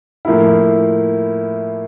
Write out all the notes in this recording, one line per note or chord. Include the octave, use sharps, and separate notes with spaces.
A2 F3 A#3 E4